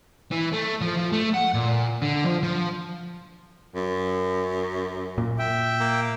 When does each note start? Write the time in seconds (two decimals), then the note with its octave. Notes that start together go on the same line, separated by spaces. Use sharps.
0.31 E3
0.53 A3
0.81 F3
0.97 F3
1.12 A3
1.34 F#5
1.54 A#2
2.02 D3
2.24 F3
2.43 F3
3.75 F#2
5.18 A#2
5.39 E5 G5
5.80 A#3